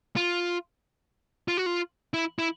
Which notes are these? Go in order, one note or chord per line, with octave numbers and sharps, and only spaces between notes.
F4
F4
F#4
F4
E4
E4